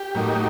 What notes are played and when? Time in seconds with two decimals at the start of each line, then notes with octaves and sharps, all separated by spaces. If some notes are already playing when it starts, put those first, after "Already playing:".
Already playing: G4
0.15 A2 F#3 A#3 D#4